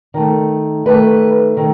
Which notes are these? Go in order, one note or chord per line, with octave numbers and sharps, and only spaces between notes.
D#3 A3
D#3 A3 B4
D#3 A3